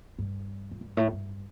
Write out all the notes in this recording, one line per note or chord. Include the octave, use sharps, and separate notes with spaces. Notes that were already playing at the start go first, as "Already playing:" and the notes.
G2
F2
G2
A2
G2